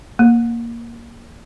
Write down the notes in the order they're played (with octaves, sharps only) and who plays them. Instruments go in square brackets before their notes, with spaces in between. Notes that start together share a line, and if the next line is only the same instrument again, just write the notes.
[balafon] A#3